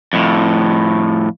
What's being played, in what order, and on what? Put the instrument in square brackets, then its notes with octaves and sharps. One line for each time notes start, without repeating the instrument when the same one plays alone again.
[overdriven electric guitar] F2 A2